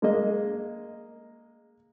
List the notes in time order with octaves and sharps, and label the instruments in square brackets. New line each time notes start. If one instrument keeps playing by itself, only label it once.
[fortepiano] G#3 A#3 D#5